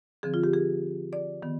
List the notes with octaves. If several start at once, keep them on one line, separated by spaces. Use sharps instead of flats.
D3 F3 C4 G#4
F4
G4
G#4
D5
D#3 B3